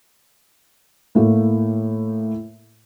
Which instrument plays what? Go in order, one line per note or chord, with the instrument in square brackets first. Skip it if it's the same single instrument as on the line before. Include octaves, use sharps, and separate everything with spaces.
[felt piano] A2 A3 A#3